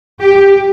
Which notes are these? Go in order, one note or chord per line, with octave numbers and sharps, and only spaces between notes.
G4